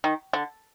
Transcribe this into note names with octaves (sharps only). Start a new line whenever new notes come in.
D#3
D3